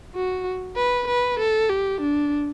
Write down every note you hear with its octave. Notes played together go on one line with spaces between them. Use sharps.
F#4
B4
B4
A4
G4
D4